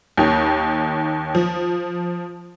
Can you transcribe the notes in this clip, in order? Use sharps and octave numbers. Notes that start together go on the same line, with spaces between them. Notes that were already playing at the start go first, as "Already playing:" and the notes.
D#2 D#3 C#4
F3